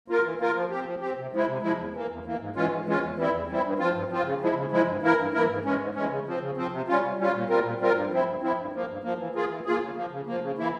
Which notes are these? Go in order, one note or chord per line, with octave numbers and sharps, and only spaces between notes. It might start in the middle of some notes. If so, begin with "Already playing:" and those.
A#3 F4 A#4
E3
A#3 F4 A#4
F3
C4 G4
F3
C4 G4
C3
F3 G#3 E4
C3
F3 G#3 E4
E2
E3 A#3
E2
E3 A#3
G#2
E3 G#3 C#4 F4
G#2
E3 G#3 C#4 F4
E2
E3 G3 C4 E4
E2
E3 G3 C4 E4
G2
F3 C4 F4
G2
F3 C4 F4
C#3
F3 G#3 E4
C#3
F3 G#3 E4
G2
E3 A#3 E4 A#4
G2
E3 A#3 E4 A#4
G#2
E3 G#3 C#4
G#2
E3 G#3 C#4
C#3
F3 C4
C#3
F3 C4
C3
G3 C#4 F4
C3
G3 C#4 F4
A#2
G3 C4 F4 A#4
A#2
G3 C4 F4 A#4
G2
F3 C4 E4
G2
F3 C4 E4
G2
F3 A#3
G2
F3 A#3
E3
A#3 F4 G#4
E3
A#3 F4 G#4
C#3
F3 A#3
C#3
F3 A#3
C#3
E3 A#3 E4